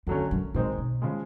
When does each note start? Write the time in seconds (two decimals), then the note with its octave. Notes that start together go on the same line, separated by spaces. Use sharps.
0.07 F2 D3 F#3 A3 C#4
0.31 F#2
0.54 A#2 D#3 G#3 C4 D#4
0.78 B2
1.02 C#3 F3 G#3